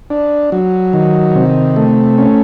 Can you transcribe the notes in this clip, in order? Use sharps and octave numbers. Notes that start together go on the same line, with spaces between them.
D4
F#3
D#3
C3
A3
C#4